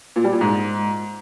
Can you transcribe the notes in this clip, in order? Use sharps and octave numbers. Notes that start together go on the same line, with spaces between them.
A#2
G3
A#2
G#2